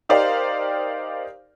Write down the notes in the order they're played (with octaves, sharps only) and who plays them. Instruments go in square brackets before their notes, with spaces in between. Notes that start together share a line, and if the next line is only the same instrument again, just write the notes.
[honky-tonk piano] D#4 G4 A#4 C5 D5 F5